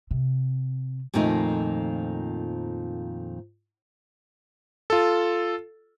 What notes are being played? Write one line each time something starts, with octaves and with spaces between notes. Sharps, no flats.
C3
F2 A#2 D#3 F3 A3 D#4
F4 A4